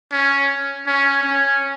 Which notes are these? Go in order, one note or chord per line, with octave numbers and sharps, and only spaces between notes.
C#4
C#4
C#4